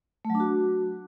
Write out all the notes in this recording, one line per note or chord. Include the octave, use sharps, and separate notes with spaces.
A3
F#3
D4
F#4